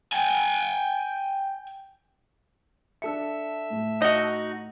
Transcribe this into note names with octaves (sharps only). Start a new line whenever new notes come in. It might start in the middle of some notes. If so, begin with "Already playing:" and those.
G5 G#5
D4 A4 E5 A5 E6 C#7
A2 A3
D#4 F#4 D#5